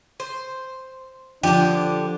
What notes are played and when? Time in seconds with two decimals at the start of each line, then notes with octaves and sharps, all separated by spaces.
0.20 C5
1.43 D3 F3 D4 G4